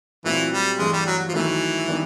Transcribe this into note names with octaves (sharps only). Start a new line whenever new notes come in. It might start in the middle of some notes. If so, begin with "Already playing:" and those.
A#2 E3 F#3 A3 C4
G3
G2 E3 G#3 A3
G3
F#3
F3
D#3 E3 F#3 A3
D#3 G3 B3 D4